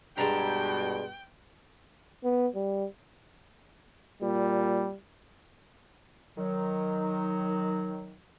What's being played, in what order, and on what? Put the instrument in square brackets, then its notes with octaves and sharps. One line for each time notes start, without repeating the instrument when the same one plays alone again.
[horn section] G2 B2 [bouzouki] G#3 D4 A#5 [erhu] G5
[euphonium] B3
G3
[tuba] A#2 [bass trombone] G3
[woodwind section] D#3 F#3